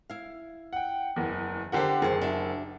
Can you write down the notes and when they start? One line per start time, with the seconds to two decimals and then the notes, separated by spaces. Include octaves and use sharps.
0.10 E4 F5
0.73 F#5 G5
1.16 F#1 E2
1.72 D3 G4 A#4 C5 F#5
2.02 F#1 G#4 C5
2.22 D4 F#4 E5